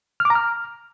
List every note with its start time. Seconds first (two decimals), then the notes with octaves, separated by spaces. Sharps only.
0.20 F6
0.25 D6
0.30 A#5
0.35 F6